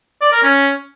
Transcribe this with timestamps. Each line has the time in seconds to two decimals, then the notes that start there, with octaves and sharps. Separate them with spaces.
0.22 D5
0.32 A#4
0.43 C#4